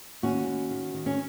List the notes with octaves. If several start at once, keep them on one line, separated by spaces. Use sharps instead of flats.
D#2 C#4 F#4
D#2
D#3
D#3
C#4